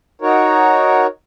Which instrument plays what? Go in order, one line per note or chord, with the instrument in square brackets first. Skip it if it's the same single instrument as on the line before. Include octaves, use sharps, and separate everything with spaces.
[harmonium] D#4 F#4 A#4 C#5